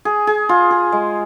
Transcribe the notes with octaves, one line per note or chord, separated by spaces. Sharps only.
G#4
G#4
F4
G#4
G#3